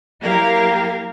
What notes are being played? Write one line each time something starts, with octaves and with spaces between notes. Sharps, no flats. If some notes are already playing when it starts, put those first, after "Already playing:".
F#3 A#3 E4 G4 A#4 F5